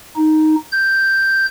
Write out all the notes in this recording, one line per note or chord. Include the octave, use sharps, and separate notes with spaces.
D#4
G6